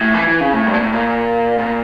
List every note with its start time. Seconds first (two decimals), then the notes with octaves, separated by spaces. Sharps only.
0.01 A2
0.14 E3
0.27 E3
0.41 C#3
0.53 A2
0.67 G2
0.74 A#2
0.80 A2
0.93 A#2
1.59 A#2